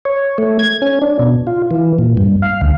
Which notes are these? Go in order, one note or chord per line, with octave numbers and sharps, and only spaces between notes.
C#5
A3
G#6
C#4
D4
B2
F4
E3
A#2
G2
F5
D2